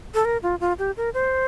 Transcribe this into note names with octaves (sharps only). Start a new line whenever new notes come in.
A4
A#4
F4
F4
G4
A#4
C5